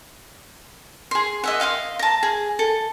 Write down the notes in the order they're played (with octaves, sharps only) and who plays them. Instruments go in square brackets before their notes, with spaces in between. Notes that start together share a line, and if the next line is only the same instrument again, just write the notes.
[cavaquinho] G#4 C6
D#5 E5 F#5
D#5 F5 G5 C6
A5 A#5
G#4
A4